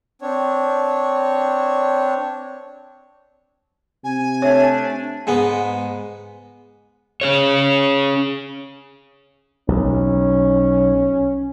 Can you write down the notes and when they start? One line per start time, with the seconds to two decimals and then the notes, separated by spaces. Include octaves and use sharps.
0.22 C4 D4 C#5
4.04 C3 G#5
4.42 A3 D4 C#5 E5
5.27 G#2 G#3 B3
7.21 C#4 G#4 C#5
9.68 B1 C#4